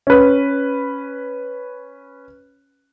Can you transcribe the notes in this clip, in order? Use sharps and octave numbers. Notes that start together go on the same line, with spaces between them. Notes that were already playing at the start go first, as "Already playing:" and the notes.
C#4 B4